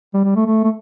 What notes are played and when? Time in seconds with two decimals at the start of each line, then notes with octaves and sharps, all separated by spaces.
0.14 G3
0.24 G3
0.35 A3
0.46 A3
0.64 A3